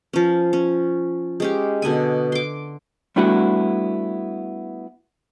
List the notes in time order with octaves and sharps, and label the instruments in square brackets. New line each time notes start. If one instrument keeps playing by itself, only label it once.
[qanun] F3 C#4
C#4
G#3 C#4 G4
B2 D3 D#5 G#5
C6 D6
[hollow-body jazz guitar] G3 A3 B3 D4 E4 F#4